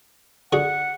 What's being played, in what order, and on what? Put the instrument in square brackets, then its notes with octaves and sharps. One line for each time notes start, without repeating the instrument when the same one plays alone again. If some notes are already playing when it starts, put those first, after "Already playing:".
[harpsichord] D3 F#4 G#4 [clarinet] F#5